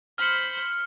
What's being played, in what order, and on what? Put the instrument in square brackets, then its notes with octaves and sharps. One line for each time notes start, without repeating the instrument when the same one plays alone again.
[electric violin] C5 B5 [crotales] F6 C#7